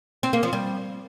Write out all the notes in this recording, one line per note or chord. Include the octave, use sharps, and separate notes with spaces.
C4
A#3
F3
G3